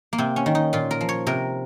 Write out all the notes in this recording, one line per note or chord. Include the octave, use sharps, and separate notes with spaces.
A#3
C3 C4
C#4
D#3
D#4
A#2 F4
A#4
F3
C#5
C3 A#4